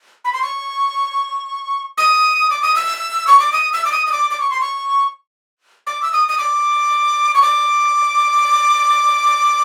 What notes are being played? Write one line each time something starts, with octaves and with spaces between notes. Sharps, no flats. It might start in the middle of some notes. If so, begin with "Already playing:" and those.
B5
C6
C#6
D#6
D6
D#6
E6
C#6
D6
D#6
E6
D6
D#6
D#6
D6
D6
C#6
C6
C#6
D6
E6
D#6
D#6
D6
C#6
D6